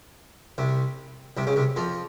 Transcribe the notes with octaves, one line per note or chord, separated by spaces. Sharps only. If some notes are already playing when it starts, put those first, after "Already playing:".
C2 C3
C2 C3
C#2 C#3
C2 C3
F2 F3